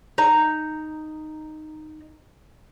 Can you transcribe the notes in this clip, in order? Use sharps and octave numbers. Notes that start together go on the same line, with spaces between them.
D#4 A#5